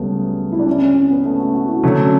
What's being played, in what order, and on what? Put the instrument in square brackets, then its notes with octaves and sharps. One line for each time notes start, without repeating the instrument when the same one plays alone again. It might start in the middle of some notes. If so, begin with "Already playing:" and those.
Already playing: [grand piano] C#2 C#3 F#3 [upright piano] G3 A3 B3
[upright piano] E4
D4
C#4
C#4
C#4
B3
A3
F#4
F#4
E4
[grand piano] D3 F#3 A3
[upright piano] C#4